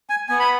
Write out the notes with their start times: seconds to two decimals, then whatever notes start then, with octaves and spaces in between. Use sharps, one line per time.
0.10 G#5
0.29 B3 G#5
0.39 B5